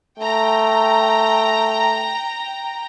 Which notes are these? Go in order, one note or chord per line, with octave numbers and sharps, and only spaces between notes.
A3 G5 A#5